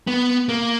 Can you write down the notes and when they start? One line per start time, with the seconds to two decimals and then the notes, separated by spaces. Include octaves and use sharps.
0.07 B3
0.49 A#3